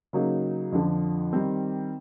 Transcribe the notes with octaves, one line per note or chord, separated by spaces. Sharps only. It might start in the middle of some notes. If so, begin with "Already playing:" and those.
C#3 F#3 A#3 D#4
F2 D3 F3
D#3 G3 C4